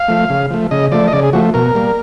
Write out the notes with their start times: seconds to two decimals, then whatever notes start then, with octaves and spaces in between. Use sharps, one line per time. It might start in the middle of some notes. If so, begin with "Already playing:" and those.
Already playing: F5
0.08 F3 A3
0.30 C#3
0.50 F3 A3
0.71 C#3 D#5
0.92 F3 A3 D5
1.08 D#5
1.13 C#3 D5
1.23 G#4
1.33 F3 A3 F#4
1.54 B2 A#4
1.75 G3 A#3